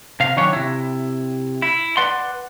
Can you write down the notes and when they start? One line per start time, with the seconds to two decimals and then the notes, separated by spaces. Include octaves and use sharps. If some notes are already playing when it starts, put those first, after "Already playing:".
0.20 C3 F5
0.37 D#3 F#3 C#4 D4 C#5
0.53 C3 E4
1.62 E4
1.97 B4 D5 F#5 C6